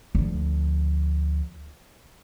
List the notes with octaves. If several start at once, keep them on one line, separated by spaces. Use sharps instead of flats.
D2 F3